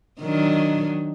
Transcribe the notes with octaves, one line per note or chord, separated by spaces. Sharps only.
D#3 F#3 D4